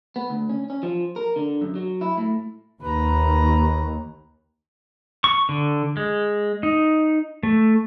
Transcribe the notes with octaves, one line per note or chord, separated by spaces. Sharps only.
B3
D2
C#4
C#4
F3
A#4
D3
F#2
F#3
E4
A2
D#2 B4 A#5
C#6
D3
G#3
D#4
A3